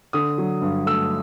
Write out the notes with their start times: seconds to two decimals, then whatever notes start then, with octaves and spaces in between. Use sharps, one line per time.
0.13 D3 D#6
0.38 F#3
0.62 G2
0.86 A3 E6